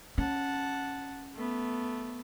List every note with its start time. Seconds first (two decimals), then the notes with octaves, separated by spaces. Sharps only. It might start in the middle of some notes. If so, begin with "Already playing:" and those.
0.18 C#4 F#5 A5
1.35 A3 B3